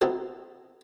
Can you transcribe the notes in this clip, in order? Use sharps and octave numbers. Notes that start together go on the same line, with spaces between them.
B3 C4 D#4 E4 F#4 A4